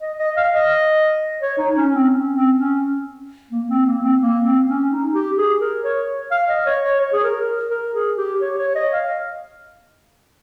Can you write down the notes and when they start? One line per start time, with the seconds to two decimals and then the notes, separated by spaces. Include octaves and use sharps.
0.01 D#5
0.19 D#5
0.37 F5
0.54 D#5
1.41 C#5
1.58 D#4
1.76 C#4
1.94 C4
2.11 C#4
2.35 C4
2.58 C#4
3.51 A#3
3.69 C4
3.86 A#3
4.03 C4
4.21 A#3
4.44 C4
4.67 C#4
4.91 D#4
5.14 G4
5.38 G#4
5.60 A#4
5.84 C#5
6.31 F5
6.49 D#5
6.66 C#5
6.83 C#5
7.00 C#5
7.13 G#4
7.24 A#4
7.70 A#4
7.94 G#4
8.18 G4
8.41 C#5
8.59 C#5
8.76 D#5
8.93 F5